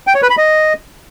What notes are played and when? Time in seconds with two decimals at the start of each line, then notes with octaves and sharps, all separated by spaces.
0.07 G5
0.15 C#5
0.22 B4
0.30 B5
0.38 D#5